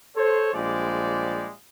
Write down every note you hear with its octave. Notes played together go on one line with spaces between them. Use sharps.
A4 C5 C#5
A#1 F3 G3 G#3 G4 D5